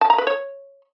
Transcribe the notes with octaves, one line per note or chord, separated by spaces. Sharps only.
A5
A#5
B4
C#5